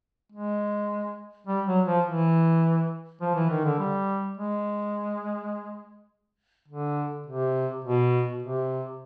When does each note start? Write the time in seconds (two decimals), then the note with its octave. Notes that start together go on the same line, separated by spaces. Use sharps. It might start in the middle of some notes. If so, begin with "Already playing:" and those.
0.32 G#3
1.47 G3
1.67 F#3
1.86 F3
2.06 E3
3.21 F3
3.35 E3
3.50 D#3
3.64 D3
3.79 G3
4.37 G#3
6.68 D3
7.26 C3
7.85 B2
8.42 C3